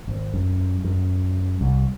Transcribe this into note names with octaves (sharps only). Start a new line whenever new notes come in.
G#1
F#2
F#2
C2